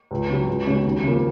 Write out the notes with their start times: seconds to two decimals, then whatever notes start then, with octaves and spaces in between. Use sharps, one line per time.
0.11 C#2
0.29 C#3 F#3
0.47 C#2
0.66 C#3 G#3 C#4 F#4
0.85 D#2
1.03 C#3 F3 A#3